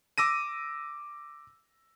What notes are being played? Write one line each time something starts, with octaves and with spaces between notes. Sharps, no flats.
D6 E6 A#6 D#7